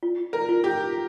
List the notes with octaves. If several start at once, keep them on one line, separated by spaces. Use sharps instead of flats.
F4
A#4
F4
G4